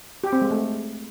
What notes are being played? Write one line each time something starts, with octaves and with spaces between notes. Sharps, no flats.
G4
C4
G#3
A3